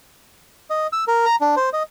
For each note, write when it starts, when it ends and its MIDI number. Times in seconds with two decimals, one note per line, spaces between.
0.70 0.87 75
0.93 1.04 88
1.08 1.26 70
1.26 1.36 82
1.41 1.55 62
1.56 1.69 72
1.73 1.83 75